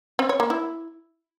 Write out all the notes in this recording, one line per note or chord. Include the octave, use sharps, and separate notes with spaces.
C4
C#5
A#3
E4